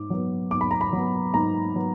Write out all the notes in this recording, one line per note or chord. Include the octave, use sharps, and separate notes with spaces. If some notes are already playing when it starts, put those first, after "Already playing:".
Already playing: G#2 D6
F#3 B3
G#2 D6
B5
A#5
B5
F#3 B3
G#2 A#5
F#3 B3